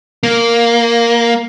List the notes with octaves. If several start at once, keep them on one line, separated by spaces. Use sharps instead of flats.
A#3